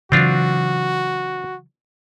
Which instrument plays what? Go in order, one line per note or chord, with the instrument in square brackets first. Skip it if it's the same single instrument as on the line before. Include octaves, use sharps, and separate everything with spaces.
[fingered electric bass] C#3 E3 F#3 [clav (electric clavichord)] C4 D4 F4 [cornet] F#4